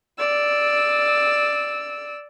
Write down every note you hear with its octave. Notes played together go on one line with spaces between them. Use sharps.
D5 E6